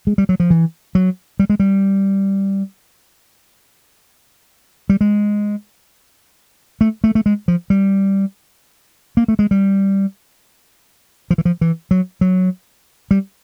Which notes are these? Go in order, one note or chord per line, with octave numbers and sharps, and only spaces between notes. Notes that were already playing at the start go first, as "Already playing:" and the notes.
G#3
G3
F#3
F3
E3
F#3
G3
G#3
G3
G3
G#3
A3
A3
A3
G#3
F3
G3
A#3
A3
G#3
G3
F3
E3
F3
E3
F#3
F#3
G3